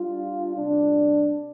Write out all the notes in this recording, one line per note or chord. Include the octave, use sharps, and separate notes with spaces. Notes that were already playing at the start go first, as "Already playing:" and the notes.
Already playing: G3 D4 F4
C3 G3 D4